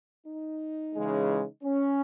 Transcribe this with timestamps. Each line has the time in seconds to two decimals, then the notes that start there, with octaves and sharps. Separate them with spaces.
0.27 D#4
0.95 C#3 E3 G#3
1.64 C#4